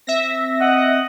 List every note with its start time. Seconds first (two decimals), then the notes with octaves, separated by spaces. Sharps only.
0.07 C4 E5 A#6
0.61 D#5 F#5